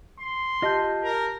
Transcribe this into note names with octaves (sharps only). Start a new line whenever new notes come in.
C6
F4 G4 D#5 A5 G6
A#4